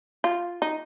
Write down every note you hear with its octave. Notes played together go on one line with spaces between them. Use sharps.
F4
D#4